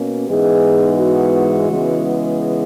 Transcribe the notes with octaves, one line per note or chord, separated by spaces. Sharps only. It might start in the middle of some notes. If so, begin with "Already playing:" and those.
Already playing: B2 A#3 C#4
G#2 E3 G#3 B3 D#4 G#4
F#4
C#3 E3 G#3 B3